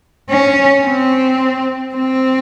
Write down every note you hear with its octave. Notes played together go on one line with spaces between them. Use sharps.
C#4
C4
C4